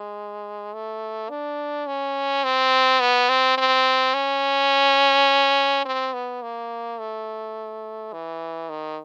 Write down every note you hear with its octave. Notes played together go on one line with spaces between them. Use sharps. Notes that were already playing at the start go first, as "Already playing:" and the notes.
Already playing: G#3
A3
D4
C#4
C4
B3
C4
C4
C#4
C4
B3
A#3
A3
E3
D#3